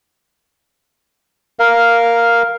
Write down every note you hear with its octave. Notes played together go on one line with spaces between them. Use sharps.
A#4 F5